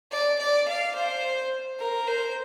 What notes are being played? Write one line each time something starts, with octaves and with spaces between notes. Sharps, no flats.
D5
D5
F5
C5
A#4
C5